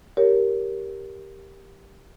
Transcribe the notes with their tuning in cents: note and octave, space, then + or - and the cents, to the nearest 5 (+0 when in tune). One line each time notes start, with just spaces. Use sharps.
G4 +0 A#4 +0 C#5 +15